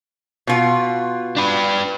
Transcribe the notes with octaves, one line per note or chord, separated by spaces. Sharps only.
B2 F4
D4 B4